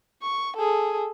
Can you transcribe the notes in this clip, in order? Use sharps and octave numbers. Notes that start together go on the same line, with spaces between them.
C#6
G#4 A4